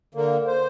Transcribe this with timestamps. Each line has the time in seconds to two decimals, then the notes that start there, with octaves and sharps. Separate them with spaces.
0.14 D3 A#3
0.47 C5